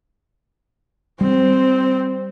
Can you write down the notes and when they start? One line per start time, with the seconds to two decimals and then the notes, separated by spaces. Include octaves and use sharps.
1.21 G3 C4